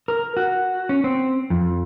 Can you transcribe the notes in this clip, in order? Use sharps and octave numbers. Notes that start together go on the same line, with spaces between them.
A#4
F#4
C#4
C4
F2